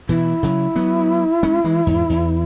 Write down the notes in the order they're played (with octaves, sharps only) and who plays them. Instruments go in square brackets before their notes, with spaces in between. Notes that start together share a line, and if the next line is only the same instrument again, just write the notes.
[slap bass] B2 E3 [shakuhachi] E4
[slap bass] C#3 F#3
F#3 B3
G#3 C#4
E3 G#3
E2 G#2
E2